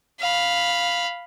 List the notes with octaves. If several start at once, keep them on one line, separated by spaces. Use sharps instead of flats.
F5 B5